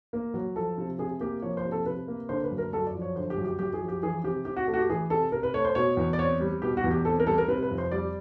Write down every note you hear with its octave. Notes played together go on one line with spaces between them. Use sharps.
A#3
F#3
F3 A4
C3
C3 G#4
A#3 G4
F3 C#5
C5
C3
A4
C3 B4
A#3
D3 C5
B4
F#2
A#4
F#2 A4
D5
F3
C#5
D3 C5
G4
F#2
G4
F#2 G4
G#4
F3
G4
E3 G#4
C3 G4
C3 G4
F#4
A3
F#4
G4
E3 G#4
C3 A4
C3 A#4
B4
A3 C#5
C5
B2 C#5
E2
D5
C4 C#5
G3
B2 G4
F#4
E2
G4
C4 A4
A#4
G3 A4
A#4
C3 B4
B4
F2
C5
G3 D5